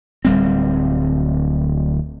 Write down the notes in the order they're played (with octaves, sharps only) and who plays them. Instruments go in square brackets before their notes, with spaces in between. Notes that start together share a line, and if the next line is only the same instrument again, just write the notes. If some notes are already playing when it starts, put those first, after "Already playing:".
[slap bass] D1 G3 C4